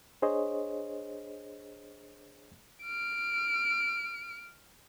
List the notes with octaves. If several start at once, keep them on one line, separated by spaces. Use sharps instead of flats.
D4 G#4 C5 C#5 D#5
F6 D7